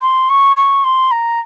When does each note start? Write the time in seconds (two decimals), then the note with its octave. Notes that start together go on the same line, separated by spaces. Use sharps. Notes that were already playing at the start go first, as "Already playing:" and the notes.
0.02 C6
0.29 C#6
0.56 C#6
0.84 C6
1.11 A#5